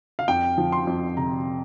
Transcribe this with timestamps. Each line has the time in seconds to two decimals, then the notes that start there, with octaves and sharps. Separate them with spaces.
0.19 F5
0.28 F2 G5
0.58 F3
0.72 C6
0.87 F2
1.17 C3 A#5